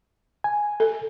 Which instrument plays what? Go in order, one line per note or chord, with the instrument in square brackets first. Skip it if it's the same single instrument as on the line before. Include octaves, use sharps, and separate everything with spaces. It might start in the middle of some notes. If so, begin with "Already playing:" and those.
[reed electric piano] G#5
[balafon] A4